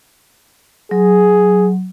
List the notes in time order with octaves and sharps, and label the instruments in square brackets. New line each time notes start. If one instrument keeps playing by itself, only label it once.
[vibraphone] F#3 [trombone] G#4